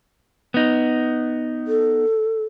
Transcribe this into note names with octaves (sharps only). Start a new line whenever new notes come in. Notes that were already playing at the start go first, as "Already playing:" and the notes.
B3 D#4
A4